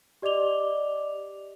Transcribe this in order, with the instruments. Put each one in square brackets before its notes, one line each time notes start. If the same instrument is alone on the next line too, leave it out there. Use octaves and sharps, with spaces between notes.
[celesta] G4 D5 D#5 D6 F7 G7